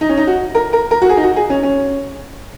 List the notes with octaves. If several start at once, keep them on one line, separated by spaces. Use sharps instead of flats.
D#4
C#4
D#4
F#4
A#4
A#4
A#4
F#4
G#4
D#4
F#4
G#4
C#4
C#4